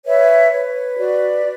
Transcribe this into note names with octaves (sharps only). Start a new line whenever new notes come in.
B4 C#5 E5
B4 C#5
F#4 D5